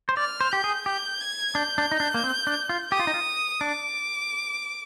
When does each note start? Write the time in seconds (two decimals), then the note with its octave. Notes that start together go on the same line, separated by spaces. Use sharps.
0.09 C5
0.17 D5 F6
0.41 C5
0.52 G4 G6
0.64 G#4
0.86 G4 G6
1.21 G#6
1.55 D4 G6
1.78 D4
1.92 D#4
2.00 D4
2.14 A#3
2.24 C4
2.47 D4
2.69 F4
2.92 G4 D#6
2.99 F4
3.07 D#4
3.14 F4
3.61 D4 D6